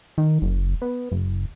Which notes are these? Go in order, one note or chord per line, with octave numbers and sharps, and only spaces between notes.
D#3
F#1
B3
F#1